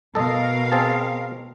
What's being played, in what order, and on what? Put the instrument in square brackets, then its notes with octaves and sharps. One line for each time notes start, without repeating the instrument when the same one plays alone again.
[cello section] B2 A#4 F5 [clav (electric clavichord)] A4 D#5
[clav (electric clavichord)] C4 G#4 A5